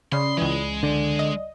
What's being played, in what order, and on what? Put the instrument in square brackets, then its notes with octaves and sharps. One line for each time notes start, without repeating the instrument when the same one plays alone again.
[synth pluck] C#3 C#4 [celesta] D5 B5 D#6 [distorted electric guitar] C6
[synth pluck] C#2 E3 [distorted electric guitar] G#3
[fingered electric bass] D3 [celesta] D5
[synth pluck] D#5